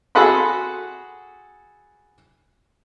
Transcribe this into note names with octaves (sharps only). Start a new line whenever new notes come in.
F#4 G#4 A4 F#5 B5 C6